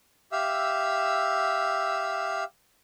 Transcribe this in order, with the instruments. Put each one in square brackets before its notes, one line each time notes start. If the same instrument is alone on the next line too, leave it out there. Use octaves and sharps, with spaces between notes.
[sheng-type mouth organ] G4 E5 F5 E6